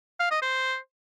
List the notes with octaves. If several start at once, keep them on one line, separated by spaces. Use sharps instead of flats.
F5
D#5
C5